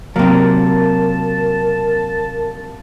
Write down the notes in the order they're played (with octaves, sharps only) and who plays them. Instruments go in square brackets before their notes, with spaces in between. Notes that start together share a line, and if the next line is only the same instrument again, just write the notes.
[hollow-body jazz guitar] C3 F#3 [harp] A#3 C4 [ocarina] A#4 [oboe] A5